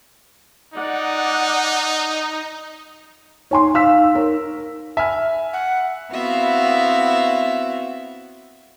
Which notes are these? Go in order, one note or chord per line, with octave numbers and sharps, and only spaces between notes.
D#4 D5 F#5
D#4 C#5 G#5 C6
F5 E6 B6
A#4 C#5
E5 G#5 B5 F6
F#5
B3 C4 E4 F#4 E5 F5